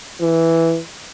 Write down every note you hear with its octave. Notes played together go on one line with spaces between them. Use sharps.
E3